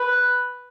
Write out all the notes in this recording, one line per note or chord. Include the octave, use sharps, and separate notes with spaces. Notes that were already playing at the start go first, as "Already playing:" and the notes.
Already playing: B4